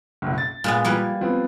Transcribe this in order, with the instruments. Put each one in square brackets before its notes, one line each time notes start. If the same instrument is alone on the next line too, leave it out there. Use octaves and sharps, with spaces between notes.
[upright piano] F#1 B1
A6
[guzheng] A#2 G#3 B3
[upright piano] F3 G#6 [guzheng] G3 A#3 B4
[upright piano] F3 B3 C4